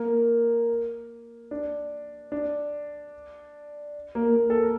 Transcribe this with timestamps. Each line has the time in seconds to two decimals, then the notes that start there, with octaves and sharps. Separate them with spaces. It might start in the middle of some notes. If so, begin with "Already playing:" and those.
Already playing: A#3
1.51 D4
2.32 D4
4.15 A#3
4.35 A#3
4.50 A4
4.63 A#4